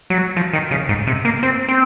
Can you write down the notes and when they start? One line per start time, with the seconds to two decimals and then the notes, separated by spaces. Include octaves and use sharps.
0.10 F#3
0.36 F3
0.53 D#3
0.71 C#3
0.89 G#2
1.07 C3
1.25 A#3
1.43 C4
1.68 C4